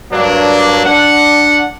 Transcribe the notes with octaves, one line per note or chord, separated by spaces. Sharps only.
G2 F#3 A#3 D4
D4 F#5